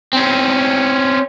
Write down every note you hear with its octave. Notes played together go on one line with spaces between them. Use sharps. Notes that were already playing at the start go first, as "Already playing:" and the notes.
C4 C#4